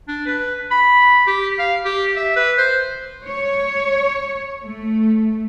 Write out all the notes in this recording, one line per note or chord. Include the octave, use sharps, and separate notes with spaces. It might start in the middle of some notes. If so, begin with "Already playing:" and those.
D4
B4
B5
G4
F5
G4
E5
B4
C5
C#5
A3